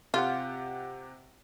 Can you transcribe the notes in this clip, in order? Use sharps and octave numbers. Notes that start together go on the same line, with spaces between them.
C3 F4 G4 F#5